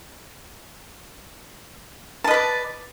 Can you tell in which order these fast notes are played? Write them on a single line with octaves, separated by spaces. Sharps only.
A5 D#5 B4 D5